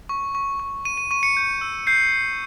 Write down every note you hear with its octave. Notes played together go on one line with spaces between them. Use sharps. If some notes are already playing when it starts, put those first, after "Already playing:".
C#6
C#6
C#6
C#6 D#7
D#7
C#6 D#7
C#7
G6
E6
G6 C7
G6